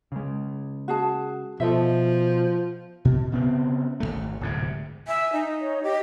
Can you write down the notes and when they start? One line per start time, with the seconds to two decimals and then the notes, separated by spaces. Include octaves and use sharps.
0.12 C#3 G#3
0.88 F#4 G#4 A5
1.60 B2 F3 A4 D#5 E5
3.05 B2
3.32 C#3 B3 C4
4.00 G#1 E2 A3
4.41 D1 G#2 C3
5.07 E5 G#5
5.33 D#4
5.61 C#5
5.83 G4 D#5